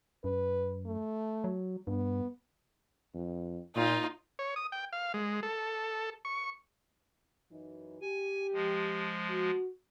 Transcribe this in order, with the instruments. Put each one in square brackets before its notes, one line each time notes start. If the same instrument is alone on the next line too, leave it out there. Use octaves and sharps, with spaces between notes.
[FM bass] F#2 [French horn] B4
[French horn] A3
[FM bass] F#3
[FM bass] G2 [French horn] B3
[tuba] F2
[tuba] A#2 [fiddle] D#4 F4
[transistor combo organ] C#5
D#6
G5
F5
G#3
A4
C#6
[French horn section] F#2 E3 D#4
[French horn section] G4 [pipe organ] G#5
[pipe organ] F3 G#3
[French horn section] F#4